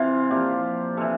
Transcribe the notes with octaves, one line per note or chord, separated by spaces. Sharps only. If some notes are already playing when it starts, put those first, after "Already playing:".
Already playing: C3 E3 F4
A#2 F3 G4
C3 E3 A4